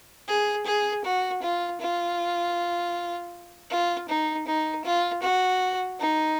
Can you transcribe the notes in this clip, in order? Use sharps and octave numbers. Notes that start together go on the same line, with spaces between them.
G#4
G#4
F#4
F4
F4
F4
D#4
D#4
F4
F#4
D#4